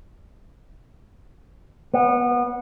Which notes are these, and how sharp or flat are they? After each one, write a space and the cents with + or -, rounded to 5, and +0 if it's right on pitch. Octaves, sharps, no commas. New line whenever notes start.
B3 -20